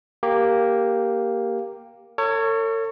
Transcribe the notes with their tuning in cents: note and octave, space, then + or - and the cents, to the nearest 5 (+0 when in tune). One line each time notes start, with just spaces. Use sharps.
A#3 +0 G4 +0
A4 +45 C#5 +0